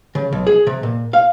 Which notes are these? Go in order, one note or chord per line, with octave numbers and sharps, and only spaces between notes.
C#3
B1
G#4
C3
A#2
F5